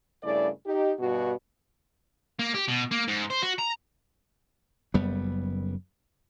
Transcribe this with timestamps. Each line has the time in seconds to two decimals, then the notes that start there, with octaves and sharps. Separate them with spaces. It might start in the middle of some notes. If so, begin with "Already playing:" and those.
0.23 G2 C#3 A3 E4 D5
0.66 D#4 G4
0.99 G2 B2 F#4
2.39 A#3
2.54 G4
2.68 B2
2.91 A#3
3.08 G#2
3.30 C5
3.42 F#4
3.58 A#5
4.94 F#1 F#2 G3 B3